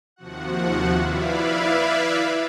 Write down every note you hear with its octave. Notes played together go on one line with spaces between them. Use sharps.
D#2 C3 F3 F#4 F#5
E4 B4 D5 E5 F5 B5